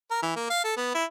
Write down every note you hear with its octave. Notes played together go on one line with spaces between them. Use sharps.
A#4
E3
A#3
F5
A4
B3
E4